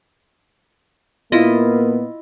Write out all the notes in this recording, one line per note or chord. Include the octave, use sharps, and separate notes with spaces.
A#2 A#3 B3 E4 F4 D#5